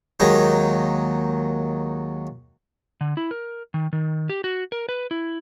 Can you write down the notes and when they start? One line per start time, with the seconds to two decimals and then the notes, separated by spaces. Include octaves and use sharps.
0.20 D#2 F#3 G#3 D#4
3.01 D3
3.17 E4
3.31 A#4
3.74 D#3
3.93 D#3
4.29 G4
4.44 F#4
4.72 A#4
4.89 B4
5.11 E4